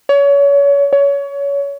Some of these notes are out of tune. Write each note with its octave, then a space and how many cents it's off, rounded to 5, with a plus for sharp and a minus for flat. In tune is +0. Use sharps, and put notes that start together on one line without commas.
C#5 +30
C#5 +25